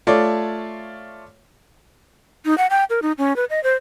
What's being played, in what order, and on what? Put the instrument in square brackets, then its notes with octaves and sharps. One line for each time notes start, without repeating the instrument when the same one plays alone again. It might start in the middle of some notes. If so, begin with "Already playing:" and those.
[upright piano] A3 F4 C#5 D5
[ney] D#4
F#5
G5
A#4
D#4
C#4
B4
D#5
C5